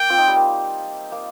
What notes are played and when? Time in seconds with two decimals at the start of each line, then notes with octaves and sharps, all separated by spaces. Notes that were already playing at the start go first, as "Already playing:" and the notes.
Already playing: A#3 G5
0.10 C4 F4
0.18 D#4
0.28 G3
0.36 A#3
1.12 A#3